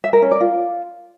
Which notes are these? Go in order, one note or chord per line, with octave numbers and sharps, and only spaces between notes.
E5
A#4
C#4
D5
F4